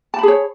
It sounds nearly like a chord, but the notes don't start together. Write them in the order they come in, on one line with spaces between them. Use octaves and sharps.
A5 B5 G#4 C#5